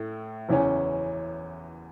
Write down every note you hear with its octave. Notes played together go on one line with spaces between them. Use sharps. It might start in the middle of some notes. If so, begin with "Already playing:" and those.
Already playing: A2 A3
F#1 E2 E3 C#4